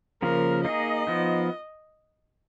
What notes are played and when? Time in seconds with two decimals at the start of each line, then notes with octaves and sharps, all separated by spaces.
0.22 C#3 F3 A#3 A#4
0.65 A#3 D#4 G#4 D#5
1.07 F3 B3 D#4